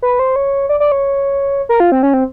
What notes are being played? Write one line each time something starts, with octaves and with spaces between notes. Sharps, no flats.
B4
C5
C#5
D5
D5
C#5
A#4
F4
C4
C#4
C4